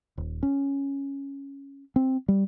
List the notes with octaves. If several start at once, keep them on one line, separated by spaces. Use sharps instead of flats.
D#1
C#4
C4
G3